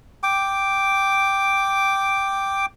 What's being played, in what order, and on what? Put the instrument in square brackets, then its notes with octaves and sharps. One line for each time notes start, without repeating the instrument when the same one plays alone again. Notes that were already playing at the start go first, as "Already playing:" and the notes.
[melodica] G5 D6